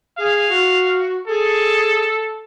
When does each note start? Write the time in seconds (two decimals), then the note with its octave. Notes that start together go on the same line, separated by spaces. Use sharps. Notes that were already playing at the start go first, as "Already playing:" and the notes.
0.18 G#4 F5
0.49 F#4
1.28 G#4 A4